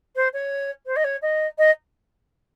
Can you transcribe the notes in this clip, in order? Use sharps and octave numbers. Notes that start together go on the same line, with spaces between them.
C5
C#5
C5
D#5
C#5
D#5
D#5